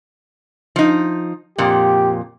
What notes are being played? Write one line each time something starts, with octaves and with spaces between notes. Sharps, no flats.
F3 D#4
F2 A#2 G4